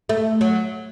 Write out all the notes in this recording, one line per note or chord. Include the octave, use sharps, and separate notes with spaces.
A3
F#3